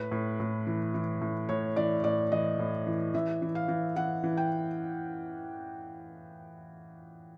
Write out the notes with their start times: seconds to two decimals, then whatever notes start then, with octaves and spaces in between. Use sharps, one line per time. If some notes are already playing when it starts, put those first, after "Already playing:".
Already playing: A2 B4
0.12 A2
0.40 A2
0.67 E3
0.94 E3
1.22 A2
1.49 A2 C#5
1.76 E3 D5
2.04 A2 D5
2.32 E3 D#5
2.59 A2
2.87 E3
3.14 E3 E5
3.42 E3
3.55 F5
3.68 E3
3.96 E3 F#5
4.24 E3
4.37 G5